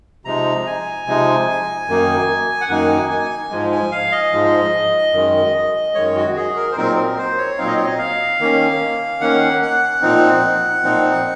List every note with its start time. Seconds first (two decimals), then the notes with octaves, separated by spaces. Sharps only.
0.25 C3 F3 G#3 D#4 A#5
0.66 G#5
1.07 C3 F3 G#3 D#4
1.88 F#2 D#3 A#3 D#4
2.61 F#5
2.69 F#2 D#3 A#3 D#4 G#5
3.10 G#5
3.50 G#2 F3 G#3
3.72 G#5
3.92 F5
4.12 D#5
4.32 G#2 F3 G#3
5.13 F#2 D#3 G#3
5.95 F#2 D#3 G#3 C#5
6.16 F#4
6.36 G#4
6.56 A#4
6.72 C5
6.76 A#2 F#3 C4 D#4 A#4
6.97 A#4
7.18 C5
7.38 C#5
7.58 A#2 F#3 C4 D#4 F5
7.67 D#5
7.77 C#5
7.85 D#5
7.98 F5
8.40 D#3 A#3 C#4
9.20 D#3 A#3 C#4 F#5
9.62 F#5
10.02 A#2 F3 C4 D#4
10.83 A#2 F3 C4 D#4